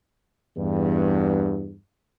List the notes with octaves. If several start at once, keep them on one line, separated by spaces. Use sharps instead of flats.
E2 G2